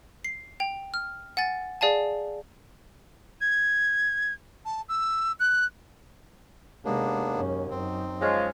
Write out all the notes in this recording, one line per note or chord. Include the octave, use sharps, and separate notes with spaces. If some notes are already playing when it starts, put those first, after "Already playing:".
C7
G5 F7
F6
F#5 G#5 A6
G#4 D5 F5 G#5 A5
G#6
A5
E6
F#6
D#2 C3 G#3 A#3 B3 D4
F#2 C#4
F#2 C4 D#4
F3 G#3 C#4 F4